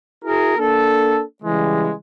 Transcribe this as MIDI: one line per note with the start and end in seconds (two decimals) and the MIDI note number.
0.25 0.58 64
0.25 0.58 66
0.25 0.58 68
0.25 0.58 70
0.58 1.23 58
0.58 1.23 62
0.58 1.23 69
1.43 1.93 49
1.43 1.93 52
1.43 1.93 55
1.43 1.93 56